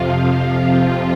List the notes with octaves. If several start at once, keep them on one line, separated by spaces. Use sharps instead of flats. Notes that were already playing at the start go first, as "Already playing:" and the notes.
Already playing: F2 C3 F3 F4